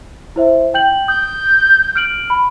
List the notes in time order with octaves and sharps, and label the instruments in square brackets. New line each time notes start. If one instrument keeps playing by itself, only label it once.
[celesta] E4 C5 E5
G5 G6 F#7
[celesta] D#6 [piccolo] G6
[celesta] F6 D7 F#7
B5